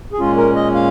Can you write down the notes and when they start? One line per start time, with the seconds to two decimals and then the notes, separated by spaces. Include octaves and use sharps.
0.13 G#4
0.19 A#2 G#3 C#4 F4
0.37 A#4
0.55 D#5
0.75 F5